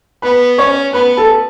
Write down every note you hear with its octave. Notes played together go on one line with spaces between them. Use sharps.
B3 B4 B5
C#4 C#5 C#6
B3 B4 B5
A4 A5